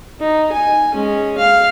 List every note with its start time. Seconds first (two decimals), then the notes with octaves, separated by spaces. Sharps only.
0.20 D#4
0.52 G#5
0.94 G#3 C#4
1.38 F5